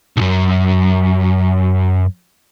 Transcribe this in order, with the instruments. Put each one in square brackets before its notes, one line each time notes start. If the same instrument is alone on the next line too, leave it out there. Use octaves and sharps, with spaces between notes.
[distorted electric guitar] B1 F#2